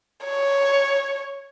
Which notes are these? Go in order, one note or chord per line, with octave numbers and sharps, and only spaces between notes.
C#5